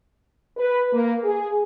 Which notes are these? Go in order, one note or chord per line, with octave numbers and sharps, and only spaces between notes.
B4
A#3
G#4